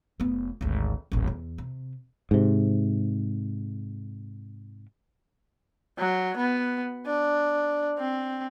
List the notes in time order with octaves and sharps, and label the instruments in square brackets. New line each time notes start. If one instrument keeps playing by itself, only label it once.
[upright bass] F1 B3
G#1 D2
D#1 A1
E2
C3
[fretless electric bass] G#2 C3
[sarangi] F#3
B3
D4
C4